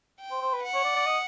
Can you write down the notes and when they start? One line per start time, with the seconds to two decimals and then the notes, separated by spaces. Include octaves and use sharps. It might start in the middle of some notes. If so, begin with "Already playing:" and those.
0.20 G5
0.31 C5
0.42 C5
0.53 B4
0.63 F#5
0.75 C#5
0.85 D5
0.96 D5
1.06 D#5